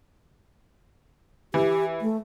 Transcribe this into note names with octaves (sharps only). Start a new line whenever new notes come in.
E3 G4
A3